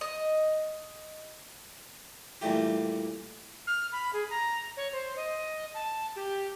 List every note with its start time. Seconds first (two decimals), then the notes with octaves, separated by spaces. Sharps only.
0.01 D#5
2.41 G2 A#2 E3 A3 G4
3.67 F6
3.92 B5
4.13 G#4
4.30 A#5
4.77 C#5
4.93 C5
5.16 D#5
5.74 A5
6.16 G4